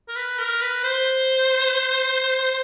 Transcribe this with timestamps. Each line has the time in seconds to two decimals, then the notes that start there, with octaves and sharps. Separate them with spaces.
0.09 A#4
0.16 B4
0.39 A#4
0.62 B4
0.84 C5